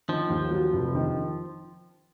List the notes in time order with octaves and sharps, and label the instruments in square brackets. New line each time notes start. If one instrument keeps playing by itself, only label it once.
[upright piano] D#3 [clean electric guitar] F3
[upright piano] D#2
F#3
F1
D#3